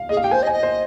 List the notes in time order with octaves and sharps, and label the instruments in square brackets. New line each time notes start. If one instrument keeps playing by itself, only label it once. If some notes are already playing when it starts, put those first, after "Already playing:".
Already playing: [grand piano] F5
[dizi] G#4 [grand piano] D#5
[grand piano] F5
[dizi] G4
[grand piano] G5
[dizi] C5 [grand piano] G#5
[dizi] D#5
[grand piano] G#5
[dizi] D#5
[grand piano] C5